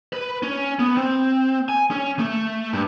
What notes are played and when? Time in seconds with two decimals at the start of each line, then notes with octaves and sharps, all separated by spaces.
0.13 B4
0.43 C#4
0.79 B3
0.97 C4
1.69 G#5
1.91 C#4
2.19 A3
2.73 G2